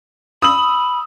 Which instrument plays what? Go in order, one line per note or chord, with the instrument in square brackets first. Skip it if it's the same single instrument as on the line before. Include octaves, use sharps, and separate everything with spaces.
[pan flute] B5 [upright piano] D#6 E6 F#7